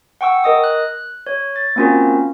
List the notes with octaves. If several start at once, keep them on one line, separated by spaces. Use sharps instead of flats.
F#5 G5 C#6 E6
A#4 D#5 D#6
F#6
C#5
A6
A#3 C4 C#4 F4 F#4 A#4